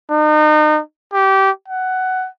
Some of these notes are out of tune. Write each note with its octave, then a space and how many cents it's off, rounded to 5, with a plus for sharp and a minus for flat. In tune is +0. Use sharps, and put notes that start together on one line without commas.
D#4 -35
G4 -20
F#5 +10